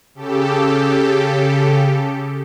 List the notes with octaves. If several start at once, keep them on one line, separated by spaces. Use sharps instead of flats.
C#3 G4 A4